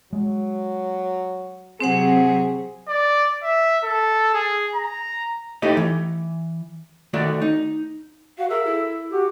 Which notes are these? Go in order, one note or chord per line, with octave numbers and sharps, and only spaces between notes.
F#3 G#3
C3 F#3 C4 G#4 C5 F#5
D5
E5
A4
G#4
A#5
A3 D#4 E4 G4 D#5
E3
D#3 A3 F#4 D5
D#4
F#4 F5
G#4 A#4 E5
E4 A4
F#4 G4